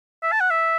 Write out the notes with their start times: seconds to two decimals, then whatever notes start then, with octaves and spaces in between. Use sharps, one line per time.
0.23 E5
0.32 A5
0.41 F#5
0.51 E5